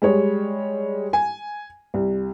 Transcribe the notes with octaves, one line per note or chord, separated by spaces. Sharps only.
G3 G#3 C#5
G#5
C2